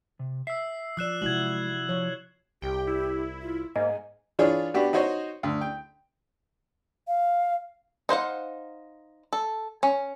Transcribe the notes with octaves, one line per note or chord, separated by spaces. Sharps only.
C3
E5 E6 C7
F3 D5 E6 F#6 E7
C3 G#3 E4 F#4 G#6 F#7
F3 C#5
C2 G4 G5
E4
F4
G#2 A#3 D#5 G#5
E3 D4 F4 G#4 C#5
B3 D4 F#4 G4
D#4 F#4 C5 C#5 D#5
D2
G5
F5
D#4 C5 F5 F#5
A4
C#4